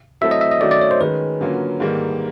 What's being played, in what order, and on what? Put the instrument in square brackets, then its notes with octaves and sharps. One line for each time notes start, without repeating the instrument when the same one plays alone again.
[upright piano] F#3 A3 C4 E4 A4 [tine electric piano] E5
[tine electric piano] D#5
E5
D#5
[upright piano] D#3 F#3 A3 C#4 F#4 [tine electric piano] D5
[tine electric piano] D5
C#5
C5
[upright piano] D#3 G#3 C#4 [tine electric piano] B4
[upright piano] D3 F#3 A#3 C#4 F4
G#2 D#3 G3 A#3